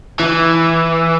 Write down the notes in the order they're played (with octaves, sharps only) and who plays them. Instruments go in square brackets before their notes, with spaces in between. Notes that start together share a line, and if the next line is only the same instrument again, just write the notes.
[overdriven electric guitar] E3